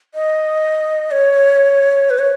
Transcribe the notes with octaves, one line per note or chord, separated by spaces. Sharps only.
D#5
C#5
B4
C#5